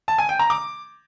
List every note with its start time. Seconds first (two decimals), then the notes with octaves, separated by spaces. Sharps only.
0.08 A5
0.18 G#5
0.29 G5
0.39 A#5
0.50 D6